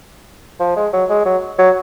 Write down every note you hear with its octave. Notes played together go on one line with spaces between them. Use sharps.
F3
G#3
F#3
G#3
F#3
F#3